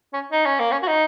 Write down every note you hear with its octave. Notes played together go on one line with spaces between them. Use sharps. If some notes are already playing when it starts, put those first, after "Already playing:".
C#4
D#4
C#4
A#3
C#4
F#4
D#4